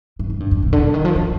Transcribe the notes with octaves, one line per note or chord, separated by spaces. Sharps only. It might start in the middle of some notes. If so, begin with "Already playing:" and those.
G#2
G#2
G2
F2
B2
D3
D3
D#3
F3
F3